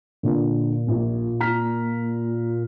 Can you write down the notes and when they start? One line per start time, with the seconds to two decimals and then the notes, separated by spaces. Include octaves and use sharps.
0.23 A#2 D3
0.86 A#1 D#2
1.40 A#5 F6 B6